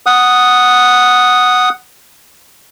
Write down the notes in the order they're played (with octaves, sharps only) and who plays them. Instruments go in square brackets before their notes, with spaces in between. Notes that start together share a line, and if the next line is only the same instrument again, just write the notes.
[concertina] F#5 D#6